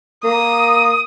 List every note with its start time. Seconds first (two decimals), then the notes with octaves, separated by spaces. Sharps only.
0.24 A#3 D#6